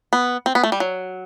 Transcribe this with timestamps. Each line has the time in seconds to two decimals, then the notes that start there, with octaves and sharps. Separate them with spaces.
0.13 B3
0.46 C4
0.55 B3
0.63 A3
0.72 G3
0.80 F#3